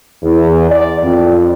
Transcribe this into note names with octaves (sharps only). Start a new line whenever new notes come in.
E2
D5
F2